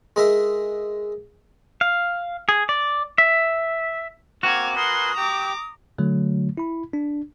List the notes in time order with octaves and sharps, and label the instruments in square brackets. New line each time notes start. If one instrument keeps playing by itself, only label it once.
[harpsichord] G#3 A#4 E5
[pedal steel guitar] F5
G#4
D5
E5
[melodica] A#3 C4 D6 [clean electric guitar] F#4 [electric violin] F6 G#6
[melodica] A#4 B4 G#5 [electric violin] C6 F#6 [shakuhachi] D#6
[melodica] G4 G5 [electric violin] A#5 D6
[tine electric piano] D3 F#3 A3
E4 B5
D4